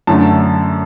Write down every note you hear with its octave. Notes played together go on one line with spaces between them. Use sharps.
F#2 D3 A3 A5